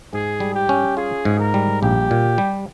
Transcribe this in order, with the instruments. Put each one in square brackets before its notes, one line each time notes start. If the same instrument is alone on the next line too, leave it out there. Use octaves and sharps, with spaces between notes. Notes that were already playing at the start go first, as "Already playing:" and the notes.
[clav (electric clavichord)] G#2 [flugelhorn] G#4
[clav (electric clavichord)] G3
[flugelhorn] G4
[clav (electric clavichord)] C#4
[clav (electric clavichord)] F4 [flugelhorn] G#4
[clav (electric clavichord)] G#2
[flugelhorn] A#4
[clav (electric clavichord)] G3
[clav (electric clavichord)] A#1 [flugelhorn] G4
[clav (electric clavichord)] A#2
G3